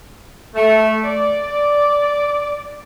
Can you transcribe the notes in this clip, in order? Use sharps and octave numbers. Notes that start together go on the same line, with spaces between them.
A3
D5